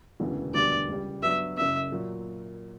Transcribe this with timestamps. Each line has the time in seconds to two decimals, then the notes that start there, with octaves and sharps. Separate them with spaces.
0.20 E1 D2 C#3 E3 B3
0.54 E1 D2 D3 G3 B3 D5
0.89 C#2 C#3 G3
1.23 G2 F#3 B3 E5
1.57 F#1 F#2 C#3 E5
1.92 A#2 F#3